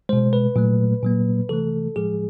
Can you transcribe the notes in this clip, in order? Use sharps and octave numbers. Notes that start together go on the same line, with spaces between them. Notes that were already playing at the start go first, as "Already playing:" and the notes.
B2 G#3 C5
B4
A#2 F#3 A3
A#2 F#3 A#3
C3 E3 A3 A4
A2 F3 G#3 G#4